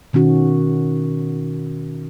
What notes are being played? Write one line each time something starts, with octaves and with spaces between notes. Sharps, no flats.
B2 D#3 C#4 F#4